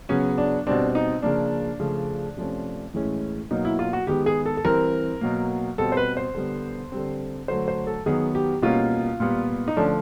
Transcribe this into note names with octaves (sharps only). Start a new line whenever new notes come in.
C#3 F#3 B3 C#4
D4
B2 G3 C4 D4
D#4
C#3 F3 A#3 D4
C#3 F3 A3
C3 F3 A3 C#4
A2 E3 G#3 C#4
B2 F#3 A#3 D#4
E4
F4
F#4
D#3 G#3 B3 G4
G#4
A4
A4
E3 G3 C4 A#4
B2 F#3 A#3
B2 G3 C4 A4
C5
B4
C5
D3 G3 B3
D3 G3 C4
D3 F#3 A3 C5
C5
A4
D#3 F#3 B3 G#4
G4
B2 G3 A#3 C#4 F4
A#2 G3 B3
D#4
D3 F3 A3 C#4 D4